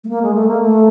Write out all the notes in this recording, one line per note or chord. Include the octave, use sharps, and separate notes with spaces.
A3
A#3
G#3
A3
A#3
A3